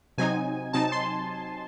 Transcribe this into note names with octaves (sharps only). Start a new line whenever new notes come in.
C3 F#3 C4 D#4 G#5
C3 F#3 C4 D#4 A5
C6